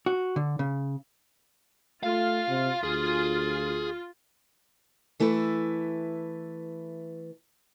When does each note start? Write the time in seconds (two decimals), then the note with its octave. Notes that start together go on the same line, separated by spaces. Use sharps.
0.06 F#4
0.36 D3
0.59 C#3
2.03 A3 F4 F5
2.48 C3
2.84 D2 G#4
5.20 E3 A3 E4 A4 B4